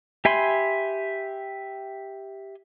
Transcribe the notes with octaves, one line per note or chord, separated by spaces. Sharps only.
G4 E5 G#5 B5 C6